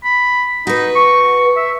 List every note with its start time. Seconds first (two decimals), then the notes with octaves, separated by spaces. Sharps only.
0.04 B5
0.67 D#4 F#4 B4
0.96 C#6
1.56 E5